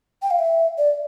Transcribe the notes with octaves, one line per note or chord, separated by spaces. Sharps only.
G5
F5
E5
D5